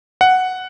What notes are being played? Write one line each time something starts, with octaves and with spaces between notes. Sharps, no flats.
F#5